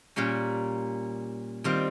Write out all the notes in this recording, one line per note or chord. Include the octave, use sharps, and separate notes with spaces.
A#2 G3 A#3 C#4
D#3 G3 C4 F4